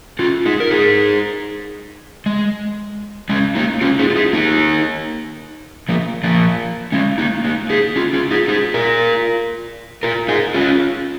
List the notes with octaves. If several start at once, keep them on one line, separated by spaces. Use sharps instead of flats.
C#4 F4
D#4 G#4
A#4
D#4 G#4
G#3
G#3 C#4
A#3 D#4
C#4 F4
D#4 G#4
F4
D#4 G#4
A#3 D#4
F3 A#3
F3 A#3
G#3 C#4
A#3 D#4
A#3 D#4
D#4 G#4
C#4 F4
C#4 F4
D#4 G#4
D#4 G#4
F4 A#4
F4 A#4
D#4 G#4
C#4 F4